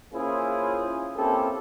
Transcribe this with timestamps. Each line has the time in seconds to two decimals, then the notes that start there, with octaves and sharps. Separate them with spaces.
0.13 A#3 C#4 E4 F4 G#4 C5
1.16 A#3 C4 C#4 E4 G4 A4